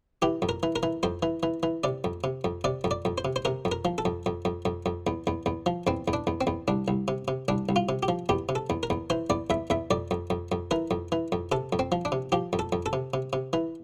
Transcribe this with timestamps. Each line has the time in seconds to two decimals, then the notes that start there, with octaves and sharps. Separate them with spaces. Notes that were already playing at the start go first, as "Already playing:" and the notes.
0.22 E3 G4
0.42 F2
0.49 A#4
0.63 E3
0.76 A#4
0.83 E3
1.03 F2 C5
1.23 E3
1.43 E3
1.63 E3
1.84 C3 D5
2.04 F2
2.24 C3
2.44 F2
2.64 C3 D5
2.84 F2
2.91 D5
3.05 F2
3.18 C5
3.25 C3
3.36 C5
3.45 C3 A#4
3.65 F2
3.72 A#4
3.85 F3
3.98 A4
4.05 F2
4.26 F2
4.45 F2
4.65 F2
4.86 F2
5.07 E2
5.27 E2
5.46 E2
5.66 F3
5.87 E2 C4
6.08 E2
6.13 D4
6.27 E2
6.41 C4
6.47 E2
6.68 C2 D4
6.88 C2
7.08 C3
7.28 C3
7.48 C2 D4
7.69 C2
7.76 F4
7.89 C3
8.03 G4
8.08 F3
8.29 E2 G4
8.49 C3
8.55 A4
8.70 E2
8.83 A#4
8.90 E2
9.10 E3 C5
9.30 E2 D5
9.50 E2 E5
9.70 E2 E5
9.91 F2 D5
10.11 F2
10.30 F2
10.52 F2
10.71 E3 A#4
10.91 F2
11.12 E3
11.32 F2
11.52 C3 A4
11.73 F2
11.79 C4
11.92 F3
12.05 D4
12.12 C3
12.32 F3 G4
12.53 F2
12.59 A4
12.72 F2
12.86 A4
12.93 C3
13.14 C3
13.33 C3
13.53 E3